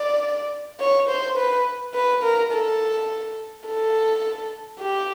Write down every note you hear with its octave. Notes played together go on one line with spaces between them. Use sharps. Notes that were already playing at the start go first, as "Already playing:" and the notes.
Already playing: D5
C#5
C5
B4
B4
A#4
A4
A4
G4